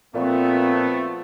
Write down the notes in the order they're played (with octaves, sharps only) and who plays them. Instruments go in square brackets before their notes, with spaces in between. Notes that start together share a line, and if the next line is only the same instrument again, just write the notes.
[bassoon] A#2 [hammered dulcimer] F3 F4 F#4 [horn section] A3 B3 [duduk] C4